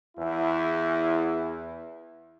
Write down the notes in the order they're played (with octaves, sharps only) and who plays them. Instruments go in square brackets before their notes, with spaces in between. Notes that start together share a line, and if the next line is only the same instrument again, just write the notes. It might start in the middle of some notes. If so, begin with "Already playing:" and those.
[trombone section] E2 E4